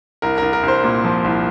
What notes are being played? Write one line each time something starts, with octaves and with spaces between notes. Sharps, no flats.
C2 A#4
C2 A#4
A#4
C2 C5
A#2
F3
C2